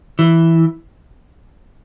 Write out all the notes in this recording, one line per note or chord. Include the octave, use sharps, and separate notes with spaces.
E3